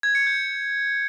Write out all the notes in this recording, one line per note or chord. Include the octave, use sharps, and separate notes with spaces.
G#6
C#7
G6